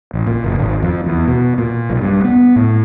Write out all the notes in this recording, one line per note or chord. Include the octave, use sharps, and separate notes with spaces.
A1
A#2
F#1
G#1
F2
E2
B2
A#2
B1
G2
B3
A2